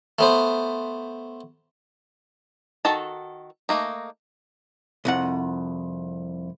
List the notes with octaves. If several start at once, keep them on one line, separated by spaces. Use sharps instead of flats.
A3 B3 C5
D#3 F#4 A4 A5
A3 A#3 D#4
C2 F2 F#5